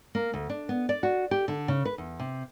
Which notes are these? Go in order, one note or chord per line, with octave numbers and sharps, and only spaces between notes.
A#3
D2
D4
B3
D5
F#4
G4
D3
C#3
B4
E2
C3